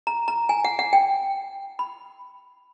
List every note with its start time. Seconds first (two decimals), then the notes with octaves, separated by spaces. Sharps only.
0.07 A#5
0.28 A#5
0.49 G#5
0.65 F#5
0.79 F#5
0.93 G5
1.79 B5